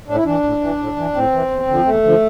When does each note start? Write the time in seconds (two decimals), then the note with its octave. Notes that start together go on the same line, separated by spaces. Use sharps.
0.08 A2 D4
0.15 E4
0.25 E3 D4
0.44 A2
0.61 E3
0.79 A2
0.96 E3
1.15 A2 C4
1.33 E3
1.51 E2
1.68 D3 F3
1.86 E2 A3
2.04 D3 F3